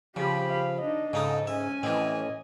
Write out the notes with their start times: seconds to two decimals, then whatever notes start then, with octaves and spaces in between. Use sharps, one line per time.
0.16 C#3 F3 G4 B5
0.50 F5
0.81 D4 D#4 D#5
1.13 G#2 C#3 D#4 A4 D#6
1.47 C#4 E5 G#5
1.83 A2 E3 C4 D#5